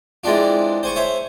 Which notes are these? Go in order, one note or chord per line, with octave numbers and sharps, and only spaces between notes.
E3 G#3 C4 D4 F4
C5 G#5 C#6
C5 C#5 E5